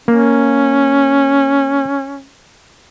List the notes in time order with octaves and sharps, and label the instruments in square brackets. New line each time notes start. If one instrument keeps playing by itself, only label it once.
[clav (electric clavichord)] A#3 [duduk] C#4